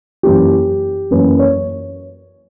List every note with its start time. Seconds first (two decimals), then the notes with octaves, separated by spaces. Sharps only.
0.23 F#2 E3 A#3 C#4 G4
1.11 F#2 E3 A#3 C#4 B4
1.39 C#5